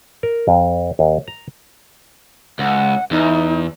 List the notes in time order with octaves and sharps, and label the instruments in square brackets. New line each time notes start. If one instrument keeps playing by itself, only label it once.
[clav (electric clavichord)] A#4
F2
D#2
A#5
[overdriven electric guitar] C#2 [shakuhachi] F#5
[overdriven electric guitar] E2 [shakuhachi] D#4